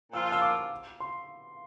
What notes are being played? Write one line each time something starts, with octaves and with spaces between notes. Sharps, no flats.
A#2 F3 A#3 F4 E6
E6
D6
C6